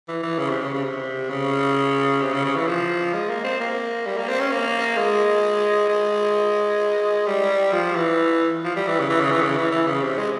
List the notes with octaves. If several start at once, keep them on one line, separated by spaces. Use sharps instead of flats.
E3
E3
C#3
C3
C#3
C#3
C3
C#3
C3
C#3
C#3
E3
F3
G#3
A#3
C4
A#3
G3
A#3
C4
C#4
A#3
G#3
G#3
G3
F3
E3
F3
G3
E3
C#3
E3
C#3
E3
C#3
E3
E3
C#3
C3
G#3